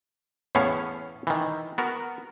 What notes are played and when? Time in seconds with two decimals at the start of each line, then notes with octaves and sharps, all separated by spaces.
0.55 E2 A2 B3 C#4 C#5 F5
1.27 D#3 E3
1.78 B3 F#4 A#4